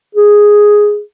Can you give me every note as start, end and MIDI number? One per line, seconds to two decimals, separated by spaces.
0.15 1.00 68